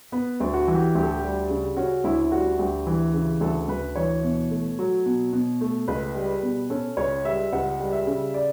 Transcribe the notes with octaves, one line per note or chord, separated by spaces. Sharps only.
B3 B4
D2
F#4
E3
G4
D2 G4
A4
G4
G3
C#3
C#4 F#4
D2 E4
G3 F#4
D2 G4
E3
C#3
D2 A4
D2 B4
E3 C#5
B2
A3
F#3
B2
B2
A3
C#2 B4
G3
B2
C#4 A4
C#2 C#5
G3 E5
C#2 F#5
G3
E5
C#3
D5